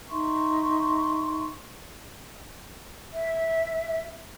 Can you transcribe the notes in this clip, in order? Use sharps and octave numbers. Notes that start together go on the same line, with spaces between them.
D#4 E5 C6 C#6
E5